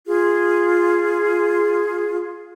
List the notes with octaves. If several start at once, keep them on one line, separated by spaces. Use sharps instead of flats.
F4 G#4